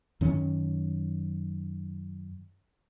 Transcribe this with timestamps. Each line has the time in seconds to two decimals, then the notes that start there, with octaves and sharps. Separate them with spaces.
0.21 F#2 D#3 C#4